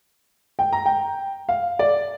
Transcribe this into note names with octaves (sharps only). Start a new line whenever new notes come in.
G5
A#5
G5
F5
D5